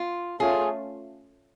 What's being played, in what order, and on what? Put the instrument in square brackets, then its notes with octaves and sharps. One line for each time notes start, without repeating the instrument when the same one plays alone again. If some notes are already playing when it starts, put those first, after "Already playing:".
Already playing: [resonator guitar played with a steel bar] F4
[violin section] A3 C#4 F4 [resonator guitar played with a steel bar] G#4